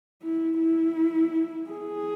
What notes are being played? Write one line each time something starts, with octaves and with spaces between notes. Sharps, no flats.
E4
E4
G#4